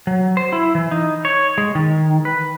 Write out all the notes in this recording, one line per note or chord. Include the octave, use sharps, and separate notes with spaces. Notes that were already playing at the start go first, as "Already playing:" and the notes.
F#3
C5
E4
E3
D#4
C#5
G#3
D#3
B4